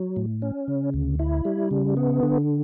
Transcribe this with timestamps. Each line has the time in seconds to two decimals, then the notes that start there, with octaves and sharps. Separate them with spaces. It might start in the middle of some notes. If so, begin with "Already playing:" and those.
Already playing: F#3
0.16 A2
0.42 C#4
0.68 C#3
0.94 D2
1.19 E4
1.45 G3
1.71 C#3
1.97 B3
2.23 D3